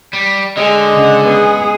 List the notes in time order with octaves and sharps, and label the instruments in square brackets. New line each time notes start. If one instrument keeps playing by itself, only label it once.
[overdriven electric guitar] G3
[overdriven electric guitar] D3 [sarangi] G#3 [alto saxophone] D#5
[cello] C#3 F#5
[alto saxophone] B3 [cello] G#4